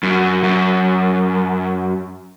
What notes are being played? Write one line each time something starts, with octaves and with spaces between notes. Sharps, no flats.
F#2
F#2